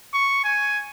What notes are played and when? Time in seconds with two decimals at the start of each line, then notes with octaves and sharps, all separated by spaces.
0.14 C#6
0.44 G#5